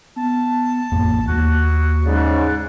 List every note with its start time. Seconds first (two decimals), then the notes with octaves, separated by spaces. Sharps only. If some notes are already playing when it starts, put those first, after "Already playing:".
0.16 B3 A5
0.92 A1 F2 A#3
1.27 D#2 A#3 F#4 F#6
2.05 G#2 C#3 D5